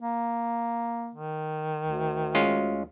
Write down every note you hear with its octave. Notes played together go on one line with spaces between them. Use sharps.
A#3
D#3
D2
G#3 C#4 F4